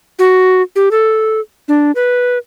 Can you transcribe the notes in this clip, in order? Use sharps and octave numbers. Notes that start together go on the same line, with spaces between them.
F#4
G4
A4
D4
B4